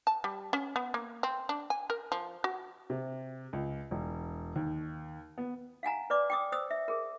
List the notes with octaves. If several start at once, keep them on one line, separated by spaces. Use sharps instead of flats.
A5
G3
C#4
B3
A#3
C4
D4
G#5
A#4
F3
F#4
C3
C#2
E1
D#2
B3
F5 F#5 G#5 A#5
B4 D5 D6
G5 D6 D#6
C5 D#6 E6
E5
G#4 A#4